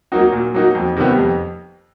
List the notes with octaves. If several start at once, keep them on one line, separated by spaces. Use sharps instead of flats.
F#3 A#3 D#4 F#4
A#2
F#3 A#3 D#4 F#4
F2
C3 D#3 G3 B3
F2